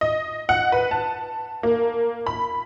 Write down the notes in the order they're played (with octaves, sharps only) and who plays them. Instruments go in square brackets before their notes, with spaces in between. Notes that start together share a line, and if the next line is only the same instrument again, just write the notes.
[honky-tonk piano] D#5
F#5
B4
A5
A#3
B5